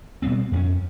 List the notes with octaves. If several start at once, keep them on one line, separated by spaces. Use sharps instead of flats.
B2 G3 B3 C4
F2 A#3 C#4